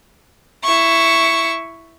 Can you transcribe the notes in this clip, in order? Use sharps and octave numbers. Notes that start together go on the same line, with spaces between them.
E4 C#6